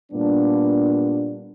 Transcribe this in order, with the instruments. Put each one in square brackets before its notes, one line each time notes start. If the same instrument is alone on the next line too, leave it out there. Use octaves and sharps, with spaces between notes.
[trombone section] A#2 G3 B3 D4